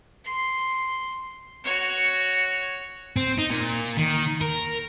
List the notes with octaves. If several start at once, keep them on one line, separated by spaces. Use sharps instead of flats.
C6
F#4 C#5
C4
D#4
A#2
D#3
A#4